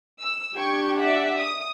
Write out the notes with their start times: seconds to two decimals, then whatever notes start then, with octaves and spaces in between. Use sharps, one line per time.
0.21 E6
0.56 D4 G4 G5 C#6 G#6
1.00 D5 E5 F#5
1.37 D#6